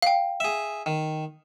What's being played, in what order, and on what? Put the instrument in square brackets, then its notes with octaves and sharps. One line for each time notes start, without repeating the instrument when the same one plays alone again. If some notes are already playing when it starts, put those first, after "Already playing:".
[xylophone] F5 G5
[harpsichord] G#4 E5
D#3